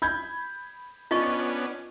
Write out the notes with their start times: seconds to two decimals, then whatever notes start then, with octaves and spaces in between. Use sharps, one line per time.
0.02 B5 G6 G#6
1.11 B3 C#4 D4 F4 D#5 C#6